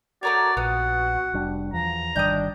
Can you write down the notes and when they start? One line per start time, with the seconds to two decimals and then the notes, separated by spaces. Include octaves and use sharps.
0.23 A3 F#4 A#4 C#5 D5
0.57 A#1 B3 F#5
1.33 F1 G3 D4
1.73 E2 F3 A#5
2.16 G1 D#3 G3 D4 D#5 G6